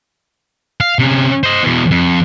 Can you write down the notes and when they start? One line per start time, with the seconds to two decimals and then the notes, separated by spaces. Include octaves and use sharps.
0.80 F5
0.99 C3 C#4
1.43 C5 D#5
1.63 E2 B2
1.91 F2